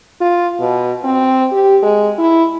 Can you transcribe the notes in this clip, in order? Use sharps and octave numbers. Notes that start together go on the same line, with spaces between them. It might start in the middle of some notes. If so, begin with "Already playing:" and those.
F4
B2
C4
G4
G#3
E4